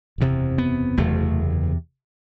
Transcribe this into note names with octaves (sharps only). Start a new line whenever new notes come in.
F#1 E2 C3
B3
F#1 E2 C3 A3